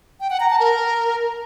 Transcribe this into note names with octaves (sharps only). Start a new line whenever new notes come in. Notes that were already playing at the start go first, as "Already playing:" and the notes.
G5
F#5
A#5
A5
A#4